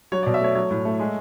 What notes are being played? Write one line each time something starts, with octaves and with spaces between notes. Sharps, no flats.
F#3 C#5
D5
B2
E5
A3 C#5
F#3 C#5
A2
A3
G#3